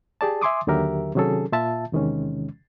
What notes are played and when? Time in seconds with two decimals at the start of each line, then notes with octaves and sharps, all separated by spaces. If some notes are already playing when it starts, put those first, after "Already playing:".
0.21 G4 G#4 D5 A5
0.41 E5 G#5 C6 D6 D#6
0.67 D#2 D3 F#3 G4 A#4 E5
1.15 C3 D#3 F#3 C#4 G#4 A4
1.52 A#2 F4 E5 A5
1.92 E2 C3 D#3 G#3 C#4